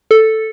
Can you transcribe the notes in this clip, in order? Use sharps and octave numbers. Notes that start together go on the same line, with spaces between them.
A4